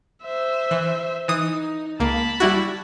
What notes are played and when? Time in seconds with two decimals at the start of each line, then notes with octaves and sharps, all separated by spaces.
0.23 C5 E5
0.71 E3
1.28 E3 D#4 D#6
2.00 C#2 A#3 A5 B5
2.40 G3 E4 F#4